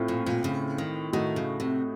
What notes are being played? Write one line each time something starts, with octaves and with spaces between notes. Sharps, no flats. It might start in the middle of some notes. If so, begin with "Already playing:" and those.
Already playing: A2 A3 C4 F4
A#2
A#2
C#3
D#3
A2 D#3 A3 D#4 F#4
C#3
C3